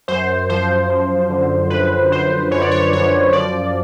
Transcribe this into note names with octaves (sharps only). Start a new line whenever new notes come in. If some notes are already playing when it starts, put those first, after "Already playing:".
F#2 C5
F3 C5
F3
D3
F#2 B4
F#2 C5
F#2 C#5
D5
C#5
F#2 C#5
F3 D5